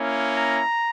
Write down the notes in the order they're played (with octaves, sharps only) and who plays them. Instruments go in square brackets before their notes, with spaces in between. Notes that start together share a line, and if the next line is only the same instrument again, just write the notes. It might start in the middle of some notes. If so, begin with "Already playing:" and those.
Already playing: [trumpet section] A#3 C#4 E4
A#5